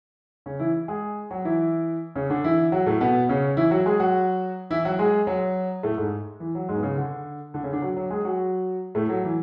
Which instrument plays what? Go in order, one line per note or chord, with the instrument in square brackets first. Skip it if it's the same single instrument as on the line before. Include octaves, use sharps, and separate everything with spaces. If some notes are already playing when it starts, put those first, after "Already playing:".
[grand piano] C#3 C#4
E3 E4
G#3 G#4
F#3 F#4
E3 E4
C#3 C#4
D3 D4
E3 E4
F#3 F#4
A2 A3
B2 B3
C#3 C#4
E3 E4
F#3 F#4
G#3 G#4
F#3 F#4
E3 E4
F#3 F#4
G#3 G#4
F#3 F#4
A2 A3
G#2 G#3
E3
F#3
G#2 G#3
B3
C#3 C#4
D3 D4
D3 D4
C#3 C#4
D3 D4
F#3 F#4
F#3 F#4
G#3 G#4
F#3 F#4
A2 A3
F#3
E3